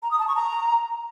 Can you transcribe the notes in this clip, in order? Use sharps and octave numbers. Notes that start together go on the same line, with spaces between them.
A#5
D#6
A5
C#6
A#5